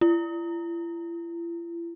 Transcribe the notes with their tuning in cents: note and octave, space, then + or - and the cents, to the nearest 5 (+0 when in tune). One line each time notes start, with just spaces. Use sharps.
E4 +45